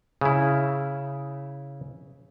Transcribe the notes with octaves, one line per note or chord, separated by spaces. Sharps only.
C#3 E4